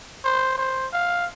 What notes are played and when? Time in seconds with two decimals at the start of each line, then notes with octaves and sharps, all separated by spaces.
0.25 C5
0.58 C5
0.93 F5